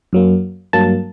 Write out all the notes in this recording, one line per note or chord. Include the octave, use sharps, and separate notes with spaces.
F#2 F#3 A#3
G2 F#3 A#3 A5